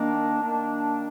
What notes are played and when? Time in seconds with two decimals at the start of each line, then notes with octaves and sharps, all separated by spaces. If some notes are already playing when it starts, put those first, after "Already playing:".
Already playing: D#3 A#3 D4
0.40 D#3 A#3 D4